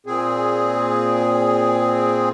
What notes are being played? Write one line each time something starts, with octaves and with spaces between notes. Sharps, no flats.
A#2 C4 G#4